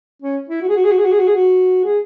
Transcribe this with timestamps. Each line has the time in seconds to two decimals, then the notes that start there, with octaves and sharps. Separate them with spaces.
0.22 C#4
0.49 E4
0.62 F#4
0.69 G#4
0.76 F#4
0.84 G#4
0.91 F#4
0.98 G#4
1.05 F#4
1.12 G#4
1.19 F#4
1.27 G#4
1.35 F#4
1.84 G#4